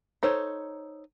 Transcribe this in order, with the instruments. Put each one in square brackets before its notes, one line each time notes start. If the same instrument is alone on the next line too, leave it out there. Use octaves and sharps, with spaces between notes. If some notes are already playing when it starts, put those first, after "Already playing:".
[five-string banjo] D#4 A4 C5 C#5